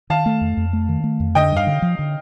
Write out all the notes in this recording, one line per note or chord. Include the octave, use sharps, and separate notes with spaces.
D#3 F5 A5
A3
F2
F2
A3
D#3
A3
F2
D3 D#5 G5
G2
F5
D3
F3
D3